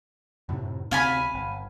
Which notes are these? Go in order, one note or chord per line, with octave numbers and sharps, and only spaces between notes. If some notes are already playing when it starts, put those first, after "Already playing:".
F#2 A2 C3
D2 C3 C4 F5 G#5 B5
G1